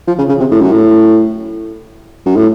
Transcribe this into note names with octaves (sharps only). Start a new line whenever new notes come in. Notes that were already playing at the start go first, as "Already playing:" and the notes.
F3
C#3
C#3
C3
A2
F#2
A2
F#2
A2